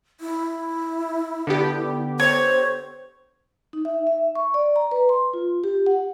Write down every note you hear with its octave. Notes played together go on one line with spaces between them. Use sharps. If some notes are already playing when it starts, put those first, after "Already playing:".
E4
D3 B3 G4
C5 C#5
D#4
E5
E5
C#6
D5
A#5
B4
C6
F4
G4
F#5